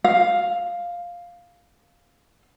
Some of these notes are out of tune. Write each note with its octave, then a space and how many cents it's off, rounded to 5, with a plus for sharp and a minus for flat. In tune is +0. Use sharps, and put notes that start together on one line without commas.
F5 +5